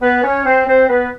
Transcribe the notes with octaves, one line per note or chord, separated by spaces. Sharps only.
B3 B4
C#4 C#5
C4 C5
C4 C5
B3 B4